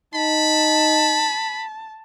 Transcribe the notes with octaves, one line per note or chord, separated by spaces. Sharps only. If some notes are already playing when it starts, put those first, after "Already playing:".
D#4 A5 B5